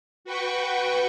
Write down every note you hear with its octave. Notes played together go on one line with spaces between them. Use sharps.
F#4 B4 G5 C#6